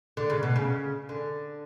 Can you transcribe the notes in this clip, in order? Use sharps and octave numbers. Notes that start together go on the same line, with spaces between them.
D3
C#3
B2
C#3
D3